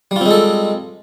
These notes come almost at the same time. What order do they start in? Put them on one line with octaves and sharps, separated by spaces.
G3 F4 C4 G#3 A4